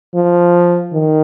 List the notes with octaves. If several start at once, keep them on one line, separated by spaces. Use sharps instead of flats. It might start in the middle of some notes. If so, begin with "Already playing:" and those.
F3
D#3